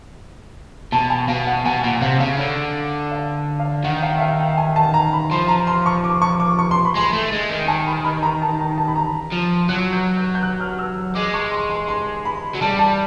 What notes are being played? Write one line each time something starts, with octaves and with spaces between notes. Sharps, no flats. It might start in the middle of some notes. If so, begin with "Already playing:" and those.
B2 A5
G#5
B2 F5
F#5
B2 G#5
A#2 F#5
C3 F5
C#3 F5
D3
F5
F5
D#3 F#5
F5
E5
F5
G5
G#5
A5
A#5
B5
F3 C6
A#5
C6
C#6
D6
C#6
D6
C#6
C6
B5
G#3 C6
A3
G#3
D#3
G#5
B5
B5
A#5
A5
A#5
A5
B5
A#5
F3
F#3 F#6
G6
G6
G6
F#6
F6
E6
G#3 D6
C#6
C6
C6
C6
B5
F#3
G3 A5
A5